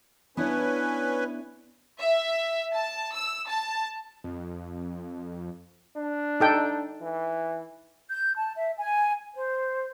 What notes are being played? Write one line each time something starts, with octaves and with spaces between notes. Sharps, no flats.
B3 C#4 D4 E4 B4 G#5
E5
A5
E6
A5
F2
D4
D#4 A4 G5
E3
G6
A5
E5
G#5
C5